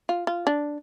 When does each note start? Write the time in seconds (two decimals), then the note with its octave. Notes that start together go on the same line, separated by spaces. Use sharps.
0.09 F4
0.27 F4
0.47 D4